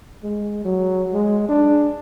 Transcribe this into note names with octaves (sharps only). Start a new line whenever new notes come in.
G#3
F#3
G#3
D4